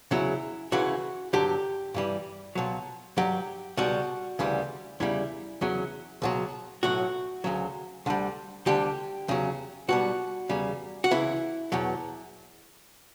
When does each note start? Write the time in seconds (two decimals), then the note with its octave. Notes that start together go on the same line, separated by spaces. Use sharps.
0.11 E2 C#3 F#3 E4
0.72 C#2 C#3 E3 F#4
1.33 G2 D3 F#3 G4
1.94 G2 E3 G3
2.55 C#2 B2 F#3
3.17 G2 F#3 G4
3.77 C#2 B2 G3 F#4
4.39 D2 C#3 E3 G3
5.00 E2 C#3 G3 E4
5.61 E2 C#3 F#3
6.22 C#2 B2 F#3
6.83 B1 A2 F#3 F#4
7.44 D2 C#3 F#3
8.06 D2 D3 G3
8.66 D2 D3 G3 G4
9.28 E2 C#3 F#3
9.88 B1 B2 G3 F#4
10.49 E2 C#3 G3
11.04 F#4
11.11 C#2 C#3 E3 E4
11.72 E2 B2 F#3